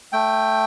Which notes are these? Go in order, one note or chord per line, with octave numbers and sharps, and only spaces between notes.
A3 G5